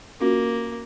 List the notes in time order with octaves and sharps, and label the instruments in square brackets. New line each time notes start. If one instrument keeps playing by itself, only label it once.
[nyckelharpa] A#3 [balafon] C#4 F4 F#4